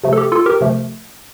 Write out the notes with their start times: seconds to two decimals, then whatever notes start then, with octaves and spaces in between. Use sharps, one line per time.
0.04 C3 F3 A3
0.13 A4
0.18 G4
0.32 F4 A4
0.46 G4 A#4
0.61 C3 F3 A3